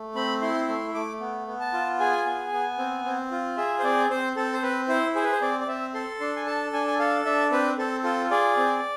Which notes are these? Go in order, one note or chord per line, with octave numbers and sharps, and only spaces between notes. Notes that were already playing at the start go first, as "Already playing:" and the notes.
Already playing: A3
C4 B5
E4 C6
A3 C6
A3 D6
B3
B3
A5
F4
G#4 G#5
B3
B3
C4
C4
F4
G#4 E5
C5
C4 D5
C4 C5
C4 A4
C5
C4 B4
E4 C5
G#4 C5
B4
C5
C4 D5
D5
C4 E5
A4 C6
D4 C6
G#5
A4 A5
D4 G#5
G#5
A4 F5
D4 E5
C4 B4
C4 A4
F4 A4
G#4 D5
C4